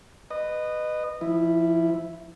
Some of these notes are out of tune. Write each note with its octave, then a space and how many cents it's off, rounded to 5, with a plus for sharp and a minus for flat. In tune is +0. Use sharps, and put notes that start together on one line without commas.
B4 +10 D#5 -20
F3 -25 E4 +0